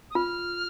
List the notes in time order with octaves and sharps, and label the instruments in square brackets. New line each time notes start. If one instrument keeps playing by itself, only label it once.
[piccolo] D#6
[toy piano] F4 [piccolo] F6